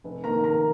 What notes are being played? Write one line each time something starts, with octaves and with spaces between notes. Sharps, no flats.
F1
D#2 D#3 A#3 A#4 A#5
F1 A#4 A#5